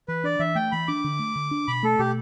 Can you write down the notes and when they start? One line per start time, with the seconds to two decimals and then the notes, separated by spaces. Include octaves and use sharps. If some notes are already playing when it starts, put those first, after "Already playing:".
0.08 E3 B4
0.24 D4 D5
0.39 E3 E5
0.55 A3 G5
0.72 E3 B5
0.88 D4 D6
1.04 D3
1.19 A3
1.36 D3
1.51 D4
1.68 B2 B5
1.83 A3 A4
1.99 B2 G4